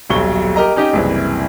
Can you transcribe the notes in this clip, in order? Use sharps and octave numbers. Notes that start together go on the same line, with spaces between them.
D#1 B1 F#3 C#6 G7
G4 A#4 D#5 A#5
C#4 D#4 G4 D#5
F#1 C2 E3